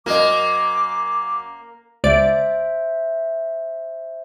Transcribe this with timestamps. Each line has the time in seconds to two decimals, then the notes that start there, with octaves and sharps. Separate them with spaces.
0.06 F#2 A#3 A#4 C5 D#5 D6
2.04 C#2 C5 D5 E5 D7